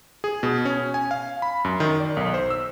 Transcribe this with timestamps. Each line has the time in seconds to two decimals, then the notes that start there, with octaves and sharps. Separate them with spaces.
0.24 G#4
0.43 B2
0.65 C#4
0.94 G#5
1.11 F5
1.42 B5
1.65 F#2
1.80 D#3
2.00 D5
2.17 B1
2.34 C5
2.50 E6